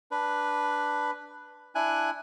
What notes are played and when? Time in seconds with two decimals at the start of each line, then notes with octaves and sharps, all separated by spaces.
0.11 D4 B4
1.75 D4 E4 G#5 F#6